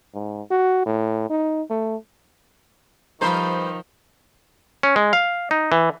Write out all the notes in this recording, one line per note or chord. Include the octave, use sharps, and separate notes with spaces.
G#2
F#4
A2
D#4
A3
D#3 F3 G3 B4 C5 A#5 B5
C#4
G#3
F5
D#4
E3